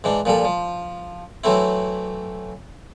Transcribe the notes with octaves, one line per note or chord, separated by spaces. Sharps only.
G#2 E3 D4
A#2 F3 G3 A4
F3
E3 F#3 A3 C4 E4